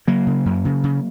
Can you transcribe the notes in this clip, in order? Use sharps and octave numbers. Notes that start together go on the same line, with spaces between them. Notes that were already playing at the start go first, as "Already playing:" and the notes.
C#3 F#3 A#3
C#3
F#2
C#3
C#3